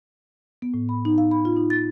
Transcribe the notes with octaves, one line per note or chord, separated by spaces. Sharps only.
B3
A2
B5
D#4
F5
B5
F4
D#4
A6